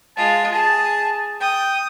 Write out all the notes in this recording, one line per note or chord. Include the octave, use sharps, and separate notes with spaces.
G#3 F4 A5
G#4 A5
G5 D#6